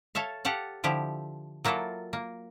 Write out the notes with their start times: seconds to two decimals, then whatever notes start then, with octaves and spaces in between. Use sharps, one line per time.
0.15 A4 C#5 E5 F5
0.45 G4 A4 F5 F#5
0.84 D3 F3 E4 G4
1.65 F#3 A#3 E4 F4 A4
2.13 A#3